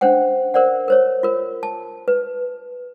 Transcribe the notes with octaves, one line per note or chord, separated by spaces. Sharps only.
C#4 D4 C5 F#5 G5
A#4 C5 D5 F#5
A#4 C5 C#5
F4 A#4
A5
B4